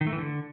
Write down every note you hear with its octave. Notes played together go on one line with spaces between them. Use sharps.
D#3
A3
E3
D3